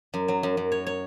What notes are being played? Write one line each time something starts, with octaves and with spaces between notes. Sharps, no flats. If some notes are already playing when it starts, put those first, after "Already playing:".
F#2
F#3
F#2
F#2
C#5
C#5